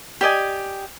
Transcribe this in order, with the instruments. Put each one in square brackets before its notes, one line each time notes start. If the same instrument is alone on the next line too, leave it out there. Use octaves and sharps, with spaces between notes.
[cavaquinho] G4 D5 D#5 G#5